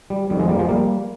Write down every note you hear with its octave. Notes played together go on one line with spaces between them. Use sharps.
G3
F2 D#3 G3
F3 G#3
G3 A#3
F3 G#3
G3 A#3